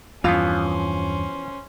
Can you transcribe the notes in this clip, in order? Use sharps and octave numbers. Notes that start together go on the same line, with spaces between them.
E2 G2 E3 F3 B3 C#4 F4 C5